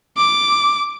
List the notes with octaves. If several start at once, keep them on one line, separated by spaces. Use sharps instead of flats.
D6